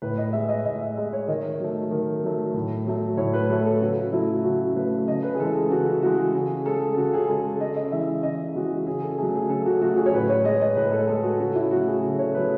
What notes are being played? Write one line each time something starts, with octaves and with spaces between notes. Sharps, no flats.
A2 B4
D#5
G#3 E5
D#5
A2 D#5
E5
G#3 D#5
C#5
D#3 D#5
F#3 A3
D#3
F#3 A3
A2
F#3 A3
A2 C#5
B4
F#3 A3 A4
A4
C#3 F#4
F#3 A3 E4
C#3 F#4
F#3 A3 B4
C#3 D#5
B4
G#4
E3 G#3 A4
G#4
C#3 F#4
E3 G#3 F#4
C#3 G#4
G#3 A4
C#3 F#4
G#4
G#3 A4
C#3 D#5
D#5
E3 G#3 E5
C#3 D#5
E3 G#3 F#4
C#3 G#4
A4
F#3 A3 G#4
G#4
C#3 A4
F#4
F#3 A3 F#4
G#4
C#5
A2 B4
C#5
G#3 D#5
D#5
A2 B4
A4
G#3 A4
F#4
C#3 F#4
E4
F#3 A3 F#4
G#4
C#3 A4
C#5
F#3 A3 B4